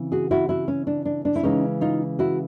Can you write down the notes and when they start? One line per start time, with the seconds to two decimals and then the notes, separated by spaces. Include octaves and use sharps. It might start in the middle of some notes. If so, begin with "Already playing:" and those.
Already playing: C#3 E3 C4
0.12 F#4 G#4
0.31 E4 F#4
0.49 E4 F#4
0.68 C#4
0.87 D4
1.05 D4
1.25 D4
1.36 E4
1.43 C#3 E3 G#3 C#4 D#4
1.81 D#4 F4
2.19 E4 F#4